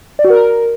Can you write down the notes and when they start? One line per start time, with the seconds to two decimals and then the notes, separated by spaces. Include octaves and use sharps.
0.19 D5
0.24 F#4
0.30 A#4